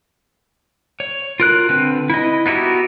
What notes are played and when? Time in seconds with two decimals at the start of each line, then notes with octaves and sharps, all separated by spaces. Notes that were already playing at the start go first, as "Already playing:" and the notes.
1.00 C#5
1.40 F4 A#4 F#6
1.69 D3 C4 B4
2.10 E4 D#5
2.46 B3 D#4 E4 F#4 G4